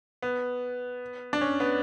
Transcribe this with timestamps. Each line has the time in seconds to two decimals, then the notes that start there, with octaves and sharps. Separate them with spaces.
0.23 B3
1.33 D4
1.41 C#4
1.60 B3